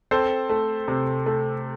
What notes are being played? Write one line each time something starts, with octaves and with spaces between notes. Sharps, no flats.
C4 A4 C5
A3
C3
A3